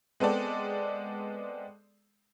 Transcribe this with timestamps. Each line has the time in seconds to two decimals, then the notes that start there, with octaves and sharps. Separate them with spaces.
0.20 G#3 B3 C4 A4 D5